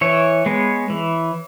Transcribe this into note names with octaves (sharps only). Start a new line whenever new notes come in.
E3 C#5
G#3 B3
E3